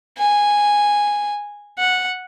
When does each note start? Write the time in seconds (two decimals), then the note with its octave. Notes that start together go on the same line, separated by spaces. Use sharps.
0.18 G#5
1.79 F#5